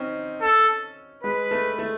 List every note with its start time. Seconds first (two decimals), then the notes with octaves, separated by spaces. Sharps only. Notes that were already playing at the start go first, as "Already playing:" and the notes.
Already playing: C4 C#4 D#4
0.42 A4
1.23 G#3 B4
1.51 A3
1.79 A3